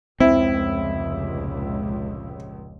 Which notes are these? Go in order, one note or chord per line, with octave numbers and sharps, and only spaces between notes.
F1 C#2 A#2 C4 E4